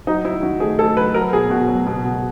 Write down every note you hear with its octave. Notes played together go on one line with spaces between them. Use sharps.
F#3 D#4
F#3 E4
D#3 F#4
A3 G#4
A3 A4
F#3 B4
F#3 A#4
B2 G#4
B2 F#4
F#3
B2
B2